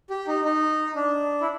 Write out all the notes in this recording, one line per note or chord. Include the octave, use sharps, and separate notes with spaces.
G4
D#4
D#4
D4
E4